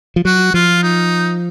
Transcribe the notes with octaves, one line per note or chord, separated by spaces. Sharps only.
F3
F#3 F#4
F3 F4
D#4